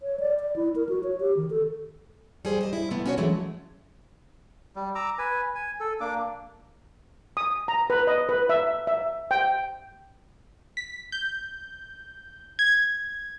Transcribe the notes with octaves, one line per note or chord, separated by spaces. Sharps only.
C#5
D5
D5
E4
A#4
F#4
C#5
G4
D#3
A4
G3 G#4 C5
C5 D#5
E4
C3 A3 B3
C#4 D4 F#4 B4 C#5
E3 F#3 G#3 A3 C#4 E4
G3
A#5 D6 E6
B4 G#5
G#5
A4
A#3 D4 D6
D#6
A#5
B4
D#5
B4
E5
E5
G5
B6
G6
G#6